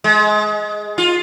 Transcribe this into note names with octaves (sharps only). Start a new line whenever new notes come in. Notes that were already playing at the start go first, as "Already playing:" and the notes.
G#3
F4